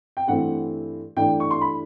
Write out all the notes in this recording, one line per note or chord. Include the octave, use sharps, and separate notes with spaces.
G5
G2 E3 A3 C4 F#5
G2 E3 A3 D4 G5
C#6
C6
B5